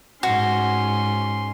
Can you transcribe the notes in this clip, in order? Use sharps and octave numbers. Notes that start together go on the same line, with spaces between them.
G#2 C#4 F#4 C6